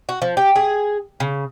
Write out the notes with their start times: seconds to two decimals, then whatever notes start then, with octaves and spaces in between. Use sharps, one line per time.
0.09 F#4
0.22 F3
0.37 G4
0.56 G#4
1.20 C#3